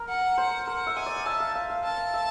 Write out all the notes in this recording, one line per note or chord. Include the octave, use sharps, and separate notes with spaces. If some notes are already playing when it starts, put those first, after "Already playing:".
Already playing: A#4
F#5
C5
A#4 F#5
E5
D#5 G#5
D5
D#5
E5 A5
F5
E5
F5
A5
E5